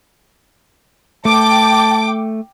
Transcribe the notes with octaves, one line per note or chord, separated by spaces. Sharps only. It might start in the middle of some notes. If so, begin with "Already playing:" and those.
A3 G5 A5 D6